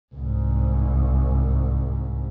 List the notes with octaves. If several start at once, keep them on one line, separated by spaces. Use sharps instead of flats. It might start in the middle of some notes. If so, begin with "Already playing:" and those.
C2 G#2